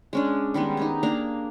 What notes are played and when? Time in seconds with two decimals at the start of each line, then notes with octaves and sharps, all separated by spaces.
0.13 G#3 C#4 D4
0.54 D#3 G3 G#3 B3
0.77 D#4 G4 G#4
1.03 A#3 D4 F5 A#5